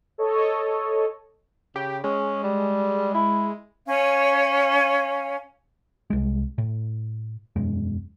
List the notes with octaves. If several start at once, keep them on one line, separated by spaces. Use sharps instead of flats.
A4 C#5 D#5
C#3 G4
G#3 C#4
G3
E4
C#4 C#5 F5 G#5
C2 G#3
A2
E1 F#2 G#3